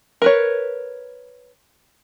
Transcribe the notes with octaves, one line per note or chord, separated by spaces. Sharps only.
A#4 B4 C#5